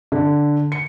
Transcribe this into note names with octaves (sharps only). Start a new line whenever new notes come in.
D3
C#7